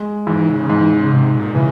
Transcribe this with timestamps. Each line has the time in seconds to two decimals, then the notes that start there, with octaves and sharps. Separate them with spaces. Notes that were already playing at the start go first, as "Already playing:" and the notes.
Already playing: G#3
0.27 G#2 E3
0.48 C#3
0.70 G#2 E3
0.91 C#3
1.12 G#2 C3
1.34 A#2
1.55 C#3 E3